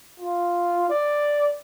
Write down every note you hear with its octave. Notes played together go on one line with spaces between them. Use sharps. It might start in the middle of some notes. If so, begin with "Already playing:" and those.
F4
D5